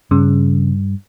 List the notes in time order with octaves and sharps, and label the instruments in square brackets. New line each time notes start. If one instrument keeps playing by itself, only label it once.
[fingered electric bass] G2 [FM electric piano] C#3